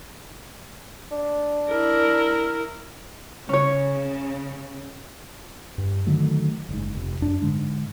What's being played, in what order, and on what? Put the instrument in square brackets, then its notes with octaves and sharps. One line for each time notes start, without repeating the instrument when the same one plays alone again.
[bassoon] D4
[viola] E4 A#4
[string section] C#3 [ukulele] C#4 C#5
[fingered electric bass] G2
D3 D#3 F#3 A3
F#1 G#2
F1
F#2 D4
G#2 D3 G#3